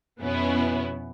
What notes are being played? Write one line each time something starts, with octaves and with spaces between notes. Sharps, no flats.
F2 B2 B3 C#4 E4